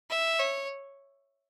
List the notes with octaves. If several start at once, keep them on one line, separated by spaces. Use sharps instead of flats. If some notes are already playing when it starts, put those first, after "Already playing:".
E5
C#5